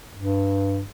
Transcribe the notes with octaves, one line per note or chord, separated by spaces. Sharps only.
G2